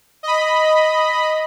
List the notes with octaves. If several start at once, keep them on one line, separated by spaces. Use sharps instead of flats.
D#5 B5